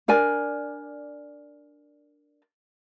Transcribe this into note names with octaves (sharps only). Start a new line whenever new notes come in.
D4 A#4 D5 G#5